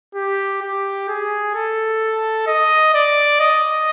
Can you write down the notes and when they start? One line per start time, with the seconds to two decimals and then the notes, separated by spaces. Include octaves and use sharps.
0.15 G4
0.62 G4
1.09 G#4
1.55 A4
2.47 D#5
2.94 D5
3.41 D#5